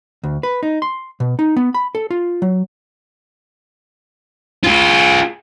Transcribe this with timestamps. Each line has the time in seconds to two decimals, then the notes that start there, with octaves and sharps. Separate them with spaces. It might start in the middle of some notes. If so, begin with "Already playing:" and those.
0.24 D2
0.43 B4
0.63 D#4
0.82 C6
1.20 B2
1.39 D#4
1.56 B3
1.74 B5
1.95 A4
2.11 F4
2.42 F#3
4.64 F4 G#4